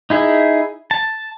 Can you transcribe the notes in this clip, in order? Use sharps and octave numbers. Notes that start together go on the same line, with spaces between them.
D#4 E4 G#4
A5